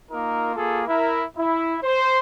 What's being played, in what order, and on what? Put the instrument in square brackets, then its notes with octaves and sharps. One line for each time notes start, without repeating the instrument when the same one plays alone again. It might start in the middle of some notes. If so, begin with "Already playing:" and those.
[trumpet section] A#3 D#4 F4 A#4
A#3 F4 G#4 A4
E4 A#4
E4
C5